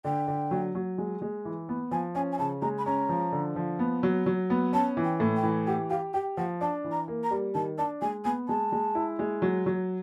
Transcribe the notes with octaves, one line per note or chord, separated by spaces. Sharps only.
D3 G5
D3
F#3
F#3
G#3
G#3
E3
B3
F3 G#5
C#4 G#5
G#5
C#3 A5
G#3 A#5
B5
C#4 A#5
F3
D3
F3
B3
F#3
F#3
B3
C#4 A5
E3
G5
A2
G5
E3
G4 F#5
G4 F5
G4 G5
F3 F#5
D4 A5
E3
A#5
A#3
A#5
G3
D#3 A5
D4 A5
G#3 G#5
B3 G#5
G#3 A5
G#3
E4
G#3
F#3
F#3